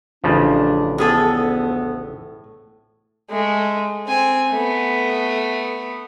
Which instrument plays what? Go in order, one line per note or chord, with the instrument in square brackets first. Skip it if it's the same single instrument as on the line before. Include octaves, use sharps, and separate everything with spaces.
[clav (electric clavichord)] A1 C#3 F3 [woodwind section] D4
[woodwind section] D2 B3 [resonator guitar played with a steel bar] A2 G#4 A4
[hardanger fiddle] G#3 A3
C4 G#5
A3 B3